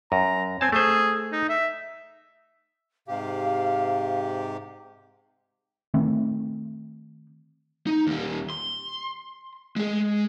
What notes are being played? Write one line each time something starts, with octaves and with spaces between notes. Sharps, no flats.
F#2 A#5
C4 G#5 A5
A3 G#4 C5
D#4
E5
G#2 C3 G4 F5
D#3 A3 C4
D#4
D#2 G3
C6
G#3 G#4